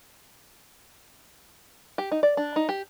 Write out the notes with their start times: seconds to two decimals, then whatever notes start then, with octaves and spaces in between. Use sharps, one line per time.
1.98 G4
2.11 D#4
2.23 D5
2.37 D4
2.56 D#4
2.69 G4